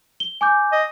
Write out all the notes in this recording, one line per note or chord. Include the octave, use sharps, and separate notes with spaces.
G7
G#5 D6 G6
D#5